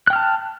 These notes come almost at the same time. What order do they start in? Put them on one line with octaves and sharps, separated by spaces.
F#6 G5 F6 A5